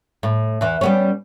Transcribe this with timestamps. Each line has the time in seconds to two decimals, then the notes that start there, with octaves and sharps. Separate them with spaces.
0.23 A2
0.61 E2 E3
0.81 G3 B3 C#4